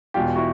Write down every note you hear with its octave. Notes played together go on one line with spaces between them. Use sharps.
E1 E2 B2 F4 G4
E4 F#4